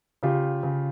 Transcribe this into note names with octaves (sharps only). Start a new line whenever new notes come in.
C#3 F4 G4
C#3